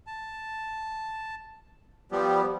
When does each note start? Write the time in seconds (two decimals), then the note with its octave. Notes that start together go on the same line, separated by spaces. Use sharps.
0.07 A5
2.12 F3 G3 B3 G4